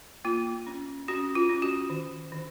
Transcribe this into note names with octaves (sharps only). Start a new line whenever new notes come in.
A#3 F4
C#4
C#4 F#4
F4
C#4
F#4
D#3
D#3